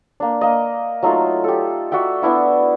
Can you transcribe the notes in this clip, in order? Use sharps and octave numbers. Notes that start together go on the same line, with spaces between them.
A#3 D4
A#3 D#5
F#3 A3 D#4 F4
G4 A4
F#4 D5 E5 G5
B3 D4 E4 F#4